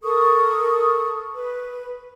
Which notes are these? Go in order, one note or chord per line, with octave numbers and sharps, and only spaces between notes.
A4 A#4 C#6 D#6
B4